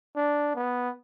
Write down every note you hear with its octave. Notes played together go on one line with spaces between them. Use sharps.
D4
B3